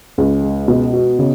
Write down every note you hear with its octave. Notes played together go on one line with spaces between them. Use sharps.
C#2
G#3
B2
F#4
C#3